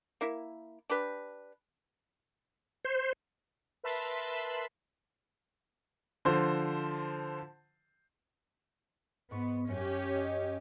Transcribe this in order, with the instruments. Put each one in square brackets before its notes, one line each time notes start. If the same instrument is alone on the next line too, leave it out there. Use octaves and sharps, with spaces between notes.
[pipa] A#3 E4
D4 G4 B4
[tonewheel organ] C5
[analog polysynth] A#4 B4 E5 A5 B5 C6
[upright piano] D3 F3 C5
[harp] G#2 C#6 [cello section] B3
[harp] F#2 [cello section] C#4 G4
[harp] D#5